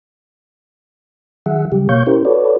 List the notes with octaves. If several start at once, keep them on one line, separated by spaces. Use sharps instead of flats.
D#3 F#3 G#4 E5 F#5
C#3 F#3 G3 G4
B2 A#3 C#5 F5 C#6 G6
C#4 E4 G4 A#4 C5
F#4 A4 B4 C#5 D5